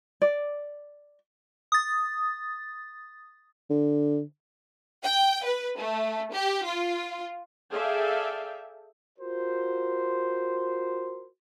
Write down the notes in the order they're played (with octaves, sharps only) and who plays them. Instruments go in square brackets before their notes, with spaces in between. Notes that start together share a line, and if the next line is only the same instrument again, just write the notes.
[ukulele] D5
[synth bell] D#6 A6
[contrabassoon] D3
[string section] G5
B4
A3
G4
F4
[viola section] G#4 A4 D5 E5 F5 G5
[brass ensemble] F4 F#4 A#4 C5